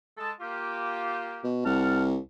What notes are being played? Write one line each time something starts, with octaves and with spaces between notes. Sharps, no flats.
G#3 A4 A5
A#3 F4 G4
B2
C2 F#5 A5 F6